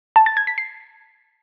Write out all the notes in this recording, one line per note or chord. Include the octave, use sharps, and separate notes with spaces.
A5
A6
G#6
B6
C7